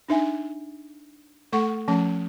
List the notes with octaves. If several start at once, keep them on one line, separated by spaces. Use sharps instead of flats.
D4 D#4 E5 G#5
A3 A4 F#5 C#6
F3 A3 C#4 A5